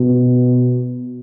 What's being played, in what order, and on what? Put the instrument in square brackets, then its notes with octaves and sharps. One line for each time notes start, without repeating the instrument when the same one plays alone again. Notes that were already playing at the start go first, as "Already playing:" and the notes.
Already playing: [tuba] B2